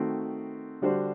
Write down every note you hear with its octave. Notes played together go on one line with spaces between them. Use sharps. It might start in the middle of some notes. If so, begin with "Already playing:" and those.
Already playing: D#3 A3 C4 F#4
D3 G3 D4 F#4 C5